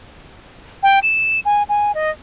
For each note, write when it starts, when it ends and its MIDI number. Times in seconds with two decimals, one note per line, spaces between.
0.83 0.99 79
1.03 1.40 100
1.45 1.63 80
1.69 1.94 80
1.95 2.11 75